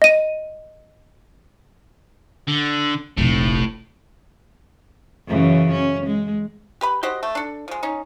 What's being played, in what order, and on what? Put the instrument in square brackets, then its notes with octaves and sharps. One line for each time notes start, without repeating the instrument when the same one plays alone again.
[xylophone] D#5 D#7
[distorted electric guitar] D3
[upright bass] F1 A#1 [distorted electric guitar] A2
[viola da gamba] F#2 C#3 E3
C#4
G#3
[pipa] G4 B4 B5
F#4 G4 C5 D#5
A3
D4 A4
F3 G#3
C#4 D#4